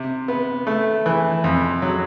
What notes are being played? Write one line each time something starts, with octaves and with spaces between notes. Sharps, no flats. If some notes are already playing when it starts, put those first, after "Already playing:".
Already playing: C3
B3
A3
E3
F2
F#3